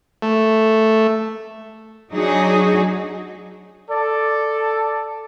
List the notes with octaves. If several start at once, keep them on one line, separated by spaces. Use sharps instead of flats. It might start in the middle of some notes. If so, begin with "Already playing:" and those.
A3
F#3 D4 D#4 F#4 G#4
A4 D5